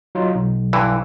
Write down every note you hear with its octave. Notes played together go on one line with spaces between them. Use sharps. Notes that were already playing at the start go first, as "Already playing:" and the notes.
F#3 D#4 F4
B1
G2 D3 E3